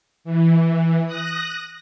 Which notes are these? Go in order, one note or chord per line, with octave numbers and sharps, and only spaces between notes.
E3
D#6 F#6 A#6